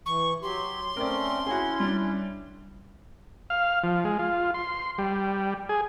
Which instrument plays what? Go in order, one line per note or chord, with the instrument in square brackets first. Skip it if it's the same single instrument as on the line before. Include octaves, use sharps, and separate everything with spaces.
[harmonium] E3 [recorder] C#6
[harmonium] F#3 G4 [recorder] C6
[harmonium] A3 C4 C#4 [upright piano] A#4 D5
[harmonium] C#4 E4 [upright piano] F#4 G#4
[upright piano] G3 D4
[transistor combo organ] F5
F3
G#3
F4
C6
G3
G#4